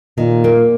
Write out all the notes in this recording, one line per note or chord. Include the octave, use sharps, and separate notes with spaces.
A#2 D#3
A#3